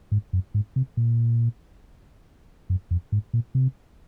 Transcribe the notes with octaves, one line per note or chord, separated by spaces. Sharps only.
G#2
F#2
G#2
C3
A#2
F#2
F2
G#2
A#2
C3